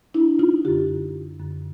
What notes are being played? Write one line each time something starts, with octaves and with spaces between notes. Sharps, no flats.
D4 E4
D#4 F4
F#2 D3 F4 G4
F#2 D3